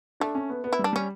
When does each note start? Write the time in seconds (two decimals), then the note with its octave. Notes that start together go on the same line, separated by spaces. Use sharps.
0.20 A3 D4
0.35 C#4
0.50 B3
0.64 B3
0.73 E4
0.79 G3
0.84 D4
0.93 G3 C#4